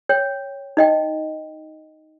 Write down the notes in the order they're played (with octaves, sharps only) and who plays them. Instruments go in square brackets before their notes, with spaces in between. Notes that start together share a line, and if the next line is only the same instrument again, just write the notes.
[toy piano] C#5 G5
D#4 D#5 G5